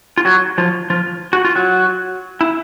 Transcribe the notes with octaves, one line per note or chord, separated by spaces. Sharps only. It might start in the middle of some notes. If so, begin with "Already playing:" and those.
F4
F#3 F#4
F3 F4
F3 F4
F#4
F4
F#3 F#4
E4